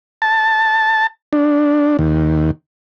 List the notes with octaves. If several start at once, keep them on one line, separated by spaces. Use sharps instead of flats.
A5
D4
D#2